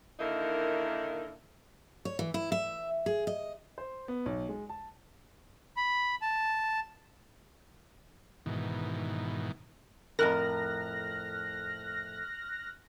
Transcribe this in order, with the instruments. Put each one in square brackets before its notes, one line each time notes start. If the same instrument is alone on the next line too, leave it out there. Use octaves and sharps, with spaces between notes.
[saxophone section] D3 D#3 A#3 D#4 E4 A#4
[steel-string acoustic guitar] C#5
E3
E4
E5
G#4
D#5
[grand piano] C5
B3
B1
G#3
A5
[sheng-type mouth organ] B5
A5
[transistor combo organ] G#2 B2 D#3 E3
[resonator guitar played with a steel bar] F2 A2 A#4 [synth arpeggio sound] F6 F#6 A#6